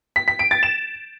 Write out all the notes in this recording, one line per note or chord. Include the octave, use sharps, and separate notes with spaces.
B6
B6
D7
A6
E7